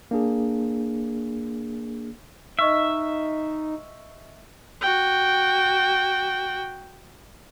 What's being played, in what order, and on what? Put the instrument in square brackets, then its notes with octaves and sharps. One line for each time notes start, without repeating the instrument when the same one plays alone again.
[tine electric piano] A#3 D4 G#4
[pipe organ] D#4 [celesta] D#5 C#6 F6 [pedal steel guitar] E5
[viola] F#4 G5